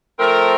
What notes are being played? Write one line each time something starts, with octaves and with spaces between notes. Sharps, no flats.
F3 A3 C4 A#4